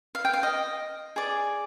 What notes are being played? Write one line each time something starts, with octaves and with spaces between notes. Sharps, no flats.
F5
G5
F5
D#5
G#4 D5